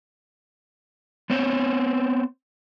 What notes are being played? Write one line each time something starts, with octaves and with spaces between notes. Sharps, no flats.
B3 C4 C5 C#5